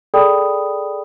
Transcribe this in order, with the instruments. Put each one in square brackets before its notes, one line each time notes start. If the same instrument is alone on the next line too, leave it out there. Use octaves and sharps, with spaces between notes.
[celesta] G#4 A4 D5 G5 B5 D#6